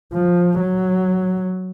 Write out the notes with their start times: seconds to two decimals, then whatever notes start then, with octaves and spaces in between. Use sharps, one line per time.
0.13 F3
0.59 F#3